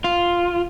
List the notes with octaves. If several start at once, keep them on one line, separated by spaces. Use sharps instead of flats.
F4